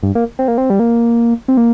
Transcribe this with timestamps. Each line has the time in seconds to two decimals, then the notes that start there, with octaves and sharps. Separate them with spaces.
0.03 G2
0.15 A#3
0.39 C4
0.48 A#3
0.58 C4
0.70 G3
0.80 A#3
1.48 C4
1.57 A#3